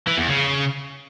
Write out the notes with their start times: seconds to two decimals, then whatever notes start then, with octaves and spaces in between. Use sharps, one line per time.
0.07 E3
0.18 E2
0.28 C#3